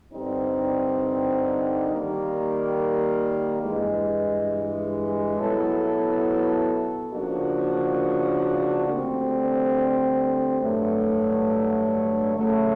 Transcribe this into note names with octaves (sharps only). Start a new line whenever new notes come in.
G2 D3 G3 C4 D#4
D#3 G3 A#3
G2 E3 G#3
B2 F#3 B3 E4 A4
C#3 F3 A#3 D4 F#4
D2 D3 G3 C4
G2 D3 F#3 A3
C#3 F#3 A3